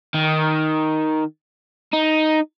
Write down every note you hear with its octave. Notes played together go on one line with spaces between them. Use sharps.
D#3
D#4